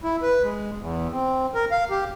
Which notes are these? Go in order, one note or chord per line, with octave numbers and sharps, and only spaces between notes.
E4
B4
G#3
E2
C4
A#4
F5
G4